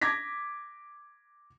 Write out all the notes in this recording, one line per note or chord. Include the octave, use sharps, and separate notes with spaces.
D6 G#6 A#6 B6